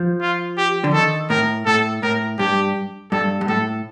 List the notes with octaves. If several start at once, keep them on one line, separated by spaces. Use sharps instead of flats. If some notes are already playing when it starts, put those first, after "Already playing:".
Already playing: F3
F4
G4
D3
D#3 A4
A2 A#4
A2 A4
A2 A#4
G2 G4
G2 A4
G2
A2 A4